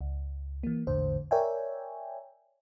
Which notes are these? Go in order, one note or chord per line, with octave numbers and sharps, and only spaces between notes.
C#2
E3 A#3
A#1 E2 A2 D3 C5
A#4 C#5 D5 E5 G5 G#5